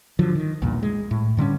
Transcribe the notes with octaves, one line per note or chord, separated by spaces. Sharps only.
D3 F3 F#3
D#3
B1 E2 G2 A#2
G#3
A2
G2 D3 G3 C#4